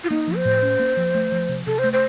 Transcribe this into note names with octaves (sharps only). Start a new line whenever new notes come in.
F4
A#3 D#4
F3
C5
A2
C#4
A#3
F3
A3
F3
C3
C3 A4
A3 C5
C5